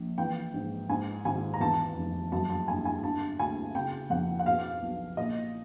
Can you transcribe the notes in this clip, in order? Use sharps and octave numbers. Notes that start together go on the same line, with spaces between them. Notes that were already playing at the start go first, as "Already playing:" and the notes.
Already playing: A#1
E3 G5
G#2
G#2 G#5
G#1 G#5
A#5
E2 A5
F1
F#2 A5
A5
G1 G#5
G#5
D3 A5
D2 G#5
C#3 G5
F2 F#5
F#5
B2 F5
B1
A#2 D#5